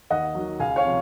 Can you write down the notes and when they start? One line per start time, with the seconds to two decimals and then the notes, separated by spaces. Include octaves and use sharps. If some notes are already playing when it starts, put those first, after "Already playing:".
0.10 D#2 D#5 F#5
0.35 D#3 F#3
0.60 C#2 F5 G#5
0.76 C#5 F5
0.84 C3 F3